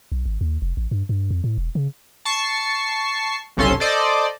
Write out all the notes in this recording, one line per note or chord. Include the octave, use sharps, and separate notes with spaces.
B1
G#1
D#2
F1
A1
G2
G2
F2
A2
E1
C#3
A5 C#6 C7
G1 C2 C#4 A4 C6
A4 C5 D5 D#5